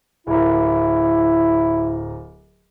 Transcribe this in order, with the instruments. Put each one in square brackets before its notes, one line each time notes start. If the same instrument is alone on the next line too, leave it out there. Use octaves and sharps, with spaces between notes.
[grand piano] D1 A#4 [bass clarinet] E4